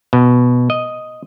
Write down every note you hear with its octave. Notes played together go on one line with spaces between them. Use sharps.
B2
D#5